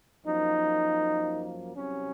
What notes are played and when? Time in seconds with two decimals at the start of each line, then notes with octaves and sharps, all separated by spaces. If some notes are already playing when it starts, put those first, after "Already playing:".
0.25 F#2 F3 A#3 D#4
1.73 C2 C3 F#3 C#4